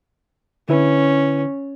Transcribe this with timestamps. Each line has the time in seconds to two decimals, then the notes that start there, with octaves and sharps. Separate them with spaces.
0.69 D3 C#4 E4 B4